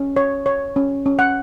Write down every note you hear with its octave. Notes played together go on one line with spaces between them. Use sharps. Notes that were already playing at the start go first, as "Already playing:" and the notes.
Already playing: C#4
C#5
C#5
C#4
C#4
F#5